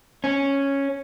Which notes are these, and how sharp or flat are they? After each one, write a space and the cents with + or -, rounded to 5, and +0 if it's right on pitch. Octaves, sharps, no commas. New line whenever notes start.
C#4 -5